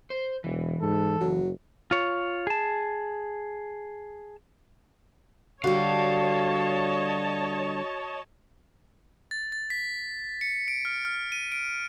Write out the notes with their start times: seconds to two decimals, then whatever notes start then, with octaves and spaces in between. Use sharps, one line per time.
0.10 C5
0.44 E1 E3
0.82 G#2 A4
1.20 F#1 F#3
1.91 F4 C#5
2.47 G#4 A5
5.64 D3 G3 F#4 C#5 D#5 F5 A5
9.31 A6
9.52 A6
9.70 B6
10.41 C#7
10.68 D7
10.85 F6
11.05 F6
11.32 D#7
11.52 D7